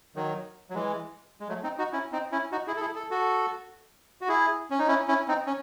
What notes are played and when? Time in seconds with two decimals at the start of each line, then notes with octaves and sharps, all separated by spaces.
0.16 D#3 F#3
0.70 F#3
0.74 E3 G#3
1.40 G#3
1.49 F#3 A3
1.63 C4 D#4
1.78 D#4 F#4
1.93 C#4 E4
2.12 C4 D#4
2.32 C#4 E4
2.52 D#4 F#4
2.67 E4 G#4
2.77 A4
2.81 E4 G#4
2.96 A4
3.11 F#4 A4
4.21 F#4
4.28 E4 G#4
4.71 C#4
4.79 D#4
4.88 C#4 E4
5.08 C#4 E4
5.28 C4 D#4
5.47 C#4